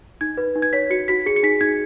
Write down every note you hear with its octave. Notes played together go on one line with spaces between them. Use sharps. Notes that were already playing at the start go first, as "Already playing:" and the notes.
D#4 G#6
B4
D#4
G#6
C#5 B6
F#4 C#7
F#4 B6
G#4 C#7
C#7
D#4 B6
D#4 G#6